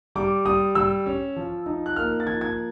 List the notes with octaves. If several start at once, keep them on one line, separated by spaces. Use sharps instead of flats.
G3 D6
G3 D#6
G3 E6
C#4
F3
D#4
F#6
A#3 F6
A6
F3 G#6
G#6